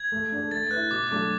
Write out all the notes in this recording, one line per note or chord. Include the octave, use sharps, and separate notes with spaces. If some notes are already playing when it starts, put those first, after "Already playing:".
Already playing: G#6
A3
D4 A4
A3 A6
E4 B4 F#6
B2 D6
D6
F#3 A3 D4 A4